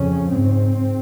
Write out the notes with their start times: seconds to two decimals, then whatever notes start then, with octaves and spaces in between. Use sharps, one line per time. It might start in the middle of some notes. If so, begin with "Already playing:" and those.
Already playing: F2 C#3 C#4
0.31 G#2 C4